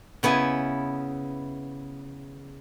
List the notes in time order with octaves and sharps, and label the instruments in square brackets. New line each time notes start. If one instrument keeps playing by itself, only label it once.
[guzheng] C#3 B3 E4 G#5